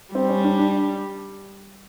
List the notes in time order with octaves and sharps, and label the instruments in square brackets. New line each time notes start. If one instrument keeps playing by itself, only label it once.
[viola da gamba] G3 [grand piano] C4
[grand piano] C#4
D4
D4